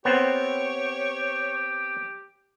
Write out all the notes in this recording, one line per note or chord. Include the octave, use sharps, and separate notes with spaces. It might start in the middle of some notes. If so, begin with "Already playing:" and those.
B3 C4 G4 C5 C#5